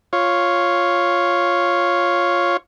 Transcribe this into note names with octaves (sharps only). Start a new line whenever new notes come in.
F4 C#5